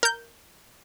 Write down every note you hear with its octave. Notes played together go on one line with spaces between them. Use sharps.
A#4 G6